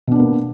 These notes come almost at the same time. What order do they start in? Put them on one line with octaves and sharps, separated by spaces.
B2 D4 B3 A#3